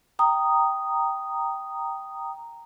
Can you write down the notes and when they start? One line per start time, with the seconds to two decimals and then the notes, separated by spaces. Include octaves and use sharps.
0.19 G5 A#5 D#6